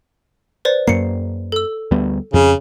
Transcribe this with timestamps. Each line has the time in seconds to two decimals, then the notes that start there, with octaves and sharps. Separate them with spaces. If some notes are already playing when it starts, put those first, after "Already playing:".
0.65 B4 C5 D5
0.88 F#2 A#3 C7 C#7
1.52 A4 E6
1.91 D2 G3 B3
2.34 F2 C#3